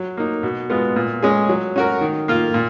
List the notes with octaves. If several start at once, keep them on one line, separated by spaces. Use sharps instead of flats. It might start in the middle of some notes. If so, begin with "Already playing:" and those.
Already playing: F#3
A#3 D#4
B2
G#3 B3 F4
A#2
G#3 C#4 G#4
F#3
C#4 F#4 A#4
D#3
A#3 F4
A#2